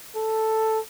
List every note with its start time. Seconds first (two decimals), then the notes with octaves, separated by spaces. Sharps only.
0.16 A4